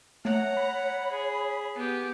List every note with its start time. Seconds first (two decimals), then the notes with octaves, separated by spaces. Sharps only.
0.25 A3 C#5 F#5 A#5
0.57 B5
1.11 G#4
1.76 B3 G4 G#5